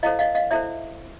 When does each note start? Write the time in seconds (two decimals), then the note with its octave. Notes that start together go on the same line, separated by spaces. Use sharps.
0.03 E4 A4 C5 D#5 F5
0.19 D#5 F5
0.35 D#5 F5
0.51 E4 A4 C5 D5 E5